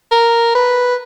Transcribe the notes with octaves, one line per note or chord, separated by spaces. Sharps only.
A#4
B4